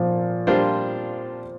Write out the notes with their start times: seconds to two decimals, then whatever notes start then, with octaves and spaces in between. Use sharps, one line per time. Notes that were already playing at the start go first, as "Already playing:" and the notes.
Already playing: A#2 F3
0.47 G3 A#3 D4 F4 C5